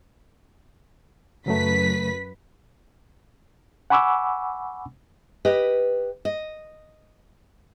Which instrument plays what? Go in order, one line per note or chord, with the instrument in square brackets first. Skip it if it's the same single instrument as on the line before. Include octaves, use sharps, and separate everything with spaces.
[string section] F#2 B4 B6 [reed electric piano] C#3 F#3 A3
[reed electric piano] F#5 G#5 B5 C#6 D6 E6
[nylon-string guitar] G4 B4 D#5
D#5